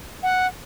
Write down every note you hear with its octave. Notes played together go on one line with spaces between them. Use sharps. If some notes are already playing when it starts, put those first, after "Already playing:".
F#5